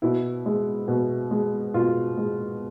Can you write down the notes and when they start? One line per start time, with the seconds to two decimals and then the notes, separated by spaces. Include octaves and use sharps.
0.02 B2 E4
0.46 G#3
0.88 B2
1.31 G#3
1.74 B2 F4
2.17 G#3